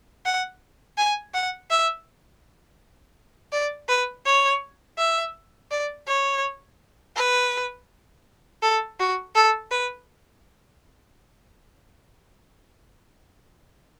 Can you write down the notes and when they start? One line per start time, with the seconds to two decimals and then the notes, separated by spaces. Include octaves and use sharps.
0.26 F#5
0.97 G#5
1.34 F#5
1.70 E5
3.53 D5
3.89 B4
4.26 C#5
4.98 E5
5.71 D5
6.08 C#5
7.16 B4
8.62 A4
8.99 F#4
9.35 A4
9.71 B4